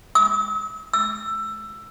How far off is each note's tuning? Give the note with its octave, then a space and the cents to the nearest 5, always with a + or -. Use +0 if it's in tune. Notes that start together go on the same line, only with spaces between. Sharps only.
E6 -45
E6 +15